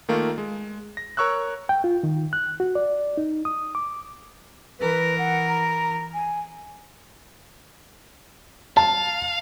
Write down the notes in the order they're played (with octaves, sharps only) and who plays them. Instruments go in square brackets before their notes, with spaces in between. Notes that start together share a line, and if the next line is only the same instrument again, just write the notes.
[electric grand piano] D#3 A3 A#3 F4
G#3
A#6
A#4 C#5 C#6 E6 F#6
[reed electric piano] G5
F4
D#3
F#6
F#4
D5
D#4
D#6
D6
[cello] E3 A#4 [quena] B4
[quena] F#5
A#5
G#5
[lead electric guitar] F5 [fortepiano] A5